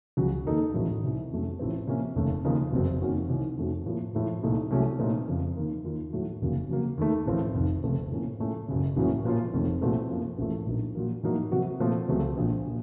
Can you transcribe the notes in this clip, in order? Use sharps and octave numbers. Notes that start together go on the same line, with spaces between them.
C#2 C#3 F#3
D#2 D#3 A#3 D#4 A4
A1 A2 F#3
C2 C3 D#3
F2 D#3 F#3 A3 C#4
A1 A2 F3 C4
C3 F3 A#3 C#4
F1 D#2 C#3 A3
D#2 C#3 F3 A#3 D#4
F#1 F2 C3 F#3 C4
F2 D#3 A#3 C#4 F#4
C2 C3 D#3
F2 D#3 A3 C#4 F#4
A2 F3 A#3 F4
A2 F3 A3
C2 A#2 A3 D#4
C2 C3 F#3 A3 C#4
A#2 A3 C4 D#4
F2 C#3 F3
D#2 D#3 A#3
D#2 D#3 A#3 F4
A2 F#3 A3
F1 D#2 C#3 F#3 A#3
C#3 F#3 A#3
D#2 D#3 A3
A1 A2 F3 C4 F4
F1 F2 D#3
F1 F2 C#3 A3 C4
A2 F3 A#3 C#4
A2 A3 C#4 F4 A4
F#1 F#2 C#3
A1 A2 F#3 A#3 C#4
A#2 F3 A#3 C#4 F4
F1 F2 D#3 A3
C2 A#2 A3 C4 F#4
F#2 F3 A#3
A1 A2 F3 A3
A#1 A#2 F#3 A#3 D#4
A#2 F#3 A#3
A2 F#3 A#3 D#4
C3 F#3 C4 F#4
A#2 F3 A3 C4
C#2 C#3 F#3 A3 C4
A#1 A#2 F3
A#2